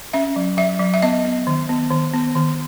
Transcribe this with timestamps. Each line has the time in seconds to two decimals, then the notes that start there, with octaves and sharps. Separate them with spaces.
0.13 C#4 E5
0.36 F#3
0.57 F#3 E5
0.80 F#3
0.94 E5
1.02 B3 D#5
1.25 B3
1.47 D#3
1.69 B3
1.91 D#3
2.13 B3
2.35 D#3